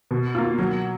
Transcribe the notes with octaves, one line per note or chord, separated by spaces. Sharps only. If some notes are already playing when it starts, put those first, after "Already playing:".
B2
A#3 F4
F#3